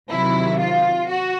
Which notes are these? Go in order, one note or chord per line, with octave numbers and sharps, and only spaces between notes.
C3 D#3 F#3 E4
F4
F#4